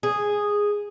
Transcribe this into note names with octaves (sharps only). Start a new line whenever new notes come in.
G#4